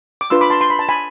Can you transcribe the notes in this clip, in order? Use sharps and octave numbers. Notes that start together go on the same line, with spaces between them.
D6
D4 F4 B4 C6 E6
B5 D6
A5 C6
C6
B5
A5
G#5 B5